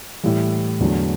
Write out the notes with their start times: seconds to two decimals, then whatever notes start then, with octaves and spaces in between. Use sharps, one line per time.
0.23 A2 E3 G3
0.80 E2 D3 F#3 A3